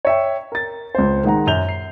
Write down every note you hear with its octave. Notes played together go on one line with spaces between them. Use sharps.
C#5 E5 G5
A#4 A6
C#2 C5
D#3 G#3 F#5 A#5
F#2 G6 F7 G7
C7